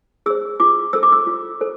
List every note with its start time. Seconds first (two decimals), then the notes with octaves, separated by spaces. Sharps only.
0.26 G#4 C5 E6
0.60 F4 D6
0.93 A4 C5 E6
1.03 D6
1.12 E6
1.27 F4
1.61 A4 C5